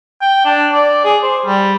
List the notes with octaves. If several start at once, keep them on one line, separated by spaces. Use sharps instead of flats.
G5
D4
D5
G#4
C5
G3